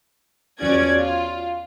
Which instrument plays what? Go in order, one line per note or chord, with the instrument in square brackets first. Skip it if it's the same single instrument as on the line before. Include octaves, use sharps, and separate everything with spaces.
[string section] E2 F3 C#4 F#4 D5 G#6
F4